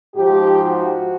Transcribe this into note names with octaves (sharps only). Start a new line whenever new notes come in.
G#2 F3 G4
F#4